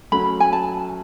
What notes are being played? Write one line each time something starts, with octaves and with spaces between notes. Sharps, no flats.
F#3 A3 C#4 F#4 B5
G#5
A5